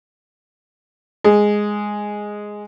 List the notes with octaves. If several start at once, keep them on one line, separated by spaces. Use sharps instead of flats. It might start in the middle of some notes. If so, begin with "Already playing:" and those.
G#3